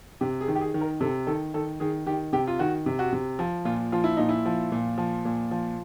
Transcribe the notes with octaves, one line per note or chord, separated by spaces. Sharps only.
C3 G4
G#4
D#3
G4
G#4
D#3
A#4
C3 A4
D#3 A4
D#3 A4
D#3 G#4
D#3 G4
C3 G4
F4
D#3 F#4
C3
F#4
C3
F3
A#2 F4
F3 F4
E4
A#2 D#4
E4
F3
A#2
F3
A#2
F3